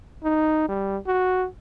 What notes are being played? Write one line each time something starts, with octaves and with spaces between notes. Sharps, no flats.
D#4
G3
F#4